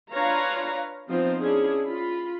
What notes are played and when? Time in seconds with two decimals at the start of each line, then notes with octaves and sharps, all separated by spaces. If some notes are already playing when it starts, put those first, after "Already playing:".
0.13 D4 F4 B4 C#5 F5 A#5
1.08 F3 B3 C4 D#4 F4 C5
1.40 C#4 D4 E4 G#4
1.86 F4 B5